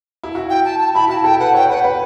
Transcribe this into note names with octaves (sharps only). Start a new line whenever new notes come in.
E4
F#4
G5
A5
A5
E4 B5
F#4 A5
A4 G5
B4 F#5
C#5 G5
B4 F#5
B4